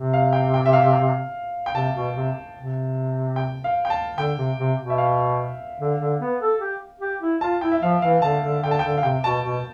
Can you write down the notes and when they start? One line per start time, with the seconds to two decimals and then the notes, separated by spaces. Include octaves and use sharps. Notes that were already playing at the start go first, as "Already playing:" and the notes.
Already playing: C3
0.13 F5
0.33 G5
0.54 G5
0.66 E5
0.73 F5
1.66 G5
1.75 C3 A5
1.95 B2
2.15 C3
2.56 C3
3.36 G5
3.64 F5
3.85 G5
3.90 A5
4.17 D3 G5
4.37 C3
4.58 C3
4.79 B2
4.90 E5
4.98 F5
5.80 D3
6.00 D3
6.20 B3
6.41 A4
6.60 G4
7.00 G4
7.21 E4
7.41 F4 A5
7.61 E4 G5
7.72 E5
7.82 F3 F5
8.02 E3 F5
8.22 D3 A5
8.43 D3
8.63 D3 G5
8.71 A5
8.79 D3 G5
8.97 F5
9.03 C3 G5
9.24 B2 A5
9.44 B2